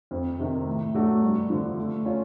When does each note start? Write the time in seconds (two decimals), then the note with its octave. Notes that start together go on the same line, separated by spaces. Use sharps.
0.11 F2
0.39 C3 D#3
0.67 A2
0.95 F#3 A3 D4 F#4
1.22 G2
1.50 D3 F3
1.77 A3
2.05 C#4 F4